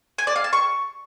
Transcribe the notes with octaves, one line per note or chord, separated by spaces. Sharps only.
G#5
D5
F5
A5
C#6